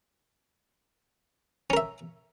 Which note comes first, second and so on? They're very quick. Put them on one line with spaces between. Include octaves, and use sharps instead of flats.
C#4 A#4 E5